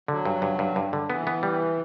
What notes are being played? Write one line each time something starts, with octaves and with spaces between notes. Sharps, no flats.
D3 F#3
G2
G2
G2
G2
D3
E3 B3
B3
G3